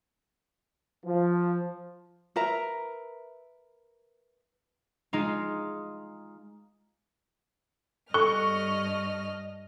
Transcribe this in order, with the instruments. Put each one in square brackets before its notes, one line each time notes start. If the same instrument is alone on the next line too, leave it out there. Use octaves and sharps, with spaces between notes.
[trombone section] F3
[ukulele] A#4 B4 E5 A#5
[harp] G#3 D#4 F4
[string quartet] G2 D#5 F6 [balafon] A4 [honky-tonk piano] C#6